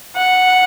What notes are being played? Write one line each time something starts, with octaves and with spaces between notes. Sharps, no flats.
F#5